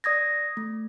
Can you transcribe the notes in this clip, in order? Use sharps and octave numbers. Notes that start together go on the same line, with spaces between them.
D5 D#6 G#6 A#6
A3